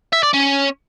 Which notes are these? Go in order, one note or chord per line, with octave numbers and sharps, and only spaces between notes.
E5
D5
C#4